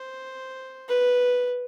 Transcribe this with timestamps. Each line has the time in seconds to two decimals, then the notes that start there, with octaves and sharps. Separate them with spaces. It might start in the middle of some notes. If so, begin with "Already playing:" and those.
Already playing: C5
0.89 B4